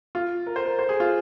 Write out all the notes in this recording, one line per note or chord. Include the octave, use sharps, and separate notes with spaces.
F4
A#4
C5
A#4
C5
G#4
F4